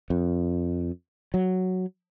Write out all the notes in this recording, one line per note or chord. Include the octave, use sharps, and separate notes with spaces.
F2
F#3